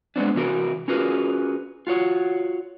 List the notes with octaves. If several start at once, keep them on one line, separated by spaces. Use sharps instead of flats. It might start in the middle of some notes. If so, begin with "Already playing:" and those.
G#3 B3 C4 D4
C3 E3 F#4 A#4
C#4 F4 F#4 G#4 A#4 B4
F4 F#4 C#5